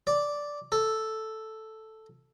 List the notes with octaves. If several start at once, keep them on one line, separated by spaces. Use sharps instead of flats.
D5
A4